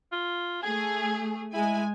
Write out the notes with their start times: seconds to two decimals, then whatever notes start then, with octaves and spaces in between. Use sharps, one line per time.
0.12 F4
0.63 A3 G#4 G#5
1.53 G#3 E4 G#5